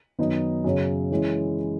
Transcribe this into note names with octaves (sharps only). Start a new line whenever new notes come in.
F#2 D#3 F#3 B3 D#4
F#2 C#3 F#3 C#4
E3 G#3 C#4 E4